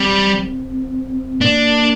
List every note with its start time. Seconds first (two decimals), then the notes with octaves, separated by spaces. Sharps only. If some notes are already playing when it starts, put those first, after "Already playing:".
Already playing: G3 C4
1.41 A#3 D4